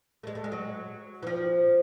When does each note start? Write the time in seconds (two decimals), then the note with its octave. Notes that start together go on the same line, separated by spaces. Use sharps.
0.23 A3
0.27 G#3
0.35 A3
0.44 G#3
0.52 F#3
1.23 E3
1.27 F3